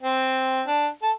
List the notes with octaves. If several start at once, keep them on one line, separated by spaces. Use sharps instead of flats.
C4
D4
A4